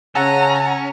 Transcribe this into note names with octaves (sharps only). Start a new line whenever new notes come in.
C#3 C#4 F#5 A5 A#5 E6